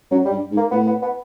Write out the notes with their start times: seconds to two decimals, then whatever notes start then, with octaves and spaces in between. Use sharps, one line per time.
0.11 F#2 F#3
0.25 G3
0.31 G2
0.51 G#2
0.57 A#3
0.71 A2 B3
0.87 B3
1.02 B3